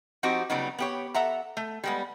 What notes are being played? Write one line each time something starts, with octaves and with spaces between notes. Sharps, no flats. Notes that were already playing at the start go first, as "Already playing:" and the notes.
F3 C4 D#4 F#4 G4
C#3 F#3 G3 B3 D#4
B3 G4 C#5
A4 E5 F#5 A#5
A3
G3 G#3 B3